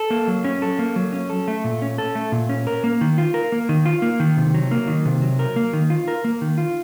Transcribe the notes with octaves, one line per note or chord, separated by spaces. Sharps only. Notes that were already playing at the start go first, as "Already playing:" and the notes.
Already playing: A4
A#3
F#3
C#4
A4
A#3
F#3
C#4
A4
A3
A#2
C#4
A4
A3
A#2
C#4
A#4
A#3
D#3
F4
A#4
A#3
D#3
F4
A#3
D#3
C3
F#3
A#3
D#3
C3
F#3
A#4
A#3
D#3
F4
A#4
A#3
D#3
F4